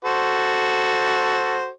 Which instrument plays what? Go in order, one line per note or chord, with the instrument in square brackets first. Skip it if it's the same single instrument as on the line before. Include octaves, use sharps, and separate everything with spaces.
[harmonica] F#4 A4 C5